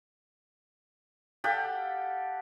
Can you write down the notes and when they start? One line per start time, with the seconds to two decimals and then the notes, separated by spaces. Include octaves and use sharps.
1.44 G4 A4 F5 F#5